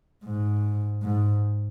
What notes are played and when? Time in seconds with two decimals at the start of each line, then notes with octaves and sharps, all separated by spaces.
0.24 G#2
1.03 G#2